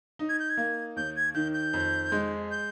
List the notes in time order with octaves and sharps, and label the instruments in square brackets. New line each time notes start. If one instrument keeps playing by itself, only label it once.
[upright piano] D#4
[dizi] G#6
G6
G#6
[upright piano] A#3
[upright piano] D#2 [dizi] G6
[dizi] G#6
[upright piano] D#3 [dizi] G6
[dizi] G6
[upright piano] F2
G#3
[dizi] G6